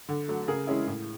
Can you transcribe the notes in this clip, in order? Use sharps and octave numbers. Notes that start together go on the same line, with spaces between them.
D3
F#3 A3
C#3 G#4 A#4
E3 G#3 C#4 E4
A2